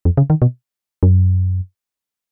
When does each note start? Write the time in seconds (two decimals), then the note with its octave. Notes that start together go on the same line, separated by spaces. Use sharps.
0.05 F2
0.17 C#3
0.30 D#3
0.42 B2
1.03 F#2